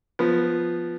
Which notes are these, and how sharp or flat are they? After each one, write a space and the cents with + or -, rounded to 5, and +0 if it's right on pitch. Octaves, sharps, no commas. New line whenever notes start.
F3 +0 B3 +0